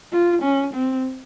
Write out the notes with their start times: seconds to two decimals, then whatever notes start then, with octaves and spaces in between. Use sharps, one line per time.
0.12 F4
0.42 C#4
0.74 C4